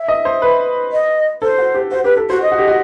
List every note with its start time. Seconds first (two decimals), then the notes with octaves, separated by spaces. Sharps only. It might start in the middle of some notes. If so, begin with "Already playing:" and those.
Already playing: E5
0.08 D#5
0.25 C5
0.42 B4
0.92 D#5
1.42 A4 C5
1.58 F#4
1.74 G4
1.91 F#4 C5
2.04 G4 B4
2.17 A4
2.29 F#4 C5
2.42 D#5
2.52 F#4
2.58 G4
2.67 F#4